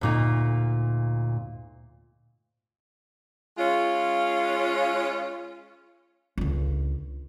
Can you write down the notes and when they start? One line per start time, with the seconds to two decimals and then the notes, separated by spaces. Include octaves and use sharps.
0.01 D2 A#2 D#4
3.58 G#3 C#4 F4
6.38 C#2 D3